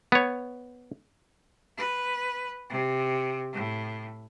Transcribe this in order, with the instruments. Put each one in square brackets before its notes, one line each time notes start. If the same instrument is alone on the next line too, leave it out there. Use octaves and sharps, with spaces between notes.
[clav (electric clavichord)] B3 C#5
[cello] B4
C3
A2